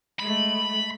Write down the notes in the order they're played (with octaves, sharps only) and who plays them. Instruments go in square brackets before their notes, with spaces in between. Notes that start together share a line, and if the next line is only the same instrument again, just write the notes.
[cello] G#3 A3 [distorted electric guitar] B5